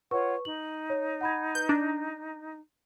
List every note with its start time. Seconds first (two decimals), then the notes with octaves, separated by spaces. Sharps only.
0.11 F4 B4 C#5 F#5 C#6
0.45 D#4 F#7
0.90 C#5
1.21 F#5 B5 G#6
1.55 B4 G6
1.69 D4 A#5 G6 A#6